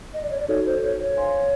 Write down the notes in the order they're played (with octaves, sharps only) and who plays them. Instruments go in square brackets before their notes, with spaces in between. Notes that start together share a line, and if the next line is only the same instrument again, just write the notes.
[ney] D#5
D5
C#5
D5
[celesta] D#4 F#4 A4 [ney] C#5
[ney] C5
C#5
C#5
[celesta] C5 F5 G#5 C6